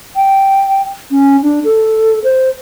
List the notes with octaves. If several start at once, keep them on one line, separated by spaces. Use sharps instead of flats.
G5
C#4
D4
A4
C5